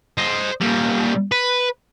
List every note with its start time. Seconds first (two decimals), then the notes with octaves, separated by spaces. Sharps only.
0.18 C5 D#5
0.61 A#2 G3
1.32 B4